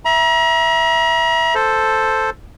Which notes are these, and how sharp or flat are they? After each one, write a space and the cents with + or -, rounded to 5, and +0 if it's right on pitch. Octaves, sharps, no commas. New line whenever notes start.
E5 +0 A#5 +40
A4 +0 C5 +0